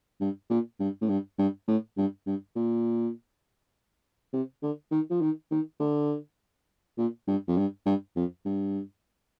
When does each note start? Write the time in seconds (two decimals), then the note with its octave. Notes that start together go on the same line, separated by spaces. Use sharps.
0.21 G2
0.50 A#2
0.80 G2
1.02 A2
1.09 G2
1.39 G2
1.68 A2
1.97 G2
2.27 G2
2.56 A#2
4.33 C3
4.62 D3
4.91 D#3
5.10 F3
5.21 D#3
5.51 D#3
5.80 D3
6.98 A#2
7.28 G2
7.48 F2
7.58 G2
7.86 G2
8.16 F2
8.45 G2